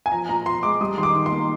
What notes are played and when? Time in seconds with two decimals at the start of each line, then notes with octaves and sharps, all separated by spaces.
0.06 G#5
0.12 F3 A#5
0.29 A#2 A#5
0.46 A#2 C6
0.63 G#3 D6
0.81 G3 D#6
0.97 D#3 C6
1.03 D6
1.15 D#3
1.26 C6
1.32 A#3